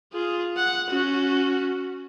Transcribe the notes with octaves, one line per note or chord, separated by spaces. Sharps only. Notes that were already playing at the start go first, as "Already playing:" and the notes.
F4 G#4
F#5
C#4 F#4